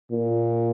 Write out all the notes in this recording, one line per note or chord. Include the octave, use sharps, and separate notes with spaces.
A#2